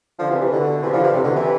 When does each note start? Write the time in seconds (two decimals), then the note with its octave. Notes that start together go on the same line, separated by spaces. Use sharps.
0.19 D3 F3
0.30 C3 E3
0.40 C3 E3
0.51 B2 D3
0.81 C3 E3
0.92 D3 F3
1.03 C3 E3
1.13 A2 C3
1.23 B2 D3
1.34 C3 E3